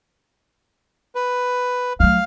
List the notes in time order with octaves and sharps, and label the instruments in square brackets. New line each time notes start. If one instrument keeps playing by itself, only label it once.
[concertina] B4
[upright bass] F#3 A3 [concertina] F5 F6